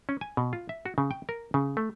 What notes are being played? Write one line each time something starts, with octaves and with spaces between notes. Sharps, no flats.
C#4
G#5
B2
F4
E5
F#4
C#3
G5
A#4
C#3
A3